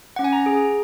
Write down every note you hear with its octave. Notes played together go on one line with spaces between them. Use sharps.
F#5
C#4
G#5
A#5
G#4